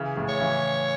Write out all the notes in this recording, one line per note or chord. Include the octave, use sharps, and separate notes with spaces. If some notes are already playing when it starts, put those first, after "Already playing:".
Already playing: C#3 E3
A2 C#3
C#5
C#3 E3